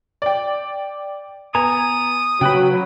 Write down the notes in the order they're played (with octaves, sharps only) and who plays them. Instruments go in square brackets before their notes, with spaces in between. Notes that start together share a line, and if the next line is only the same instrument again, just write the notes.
[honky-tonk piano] D5 G5
[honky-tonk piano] B3 [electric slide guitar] G#5 A#5 [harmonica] D#6
[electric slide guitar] C#3 B4 [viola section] F#3 [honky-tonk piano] G5 F#6